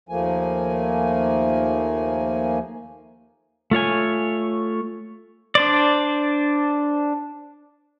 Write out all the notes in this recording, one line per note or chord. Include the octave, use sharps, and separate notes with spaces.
D#2 F3 A3 A#3 G#5
A3 F4 C#5 G#5
D4 C5 D5